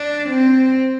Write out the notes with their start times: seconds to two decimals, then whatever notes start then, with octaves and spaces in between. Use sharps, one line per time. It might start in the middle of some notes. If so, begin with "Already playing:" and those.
Already playing: D4
0.29 C4